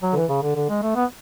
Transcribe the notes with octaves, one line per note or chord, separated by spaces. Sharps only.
F#3
D3
E3
C#3
D3
D3
G#3
A3
B3